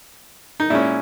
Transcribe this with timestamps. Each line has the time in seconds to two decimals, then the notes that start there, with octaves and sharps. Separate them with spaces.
0.60 D#4
0.70 A#2 G#3 C#4 E4